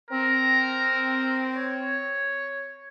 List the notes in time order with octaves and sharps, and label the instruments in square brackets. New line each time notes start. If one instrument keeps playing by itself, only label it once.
[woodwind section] C4 [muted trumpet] A#4
[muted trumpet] C#5